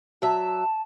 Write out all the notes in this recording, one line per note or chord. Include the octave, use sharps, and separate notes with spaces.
F#3 E5 A5